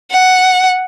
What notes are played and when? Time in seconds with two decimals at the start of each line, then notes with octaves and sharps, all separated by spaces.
0.11 F#5